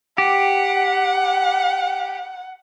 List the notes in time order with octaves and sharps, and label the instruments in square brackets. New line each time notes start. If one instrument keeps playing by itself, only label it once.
[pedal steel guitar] G4 [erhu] F#5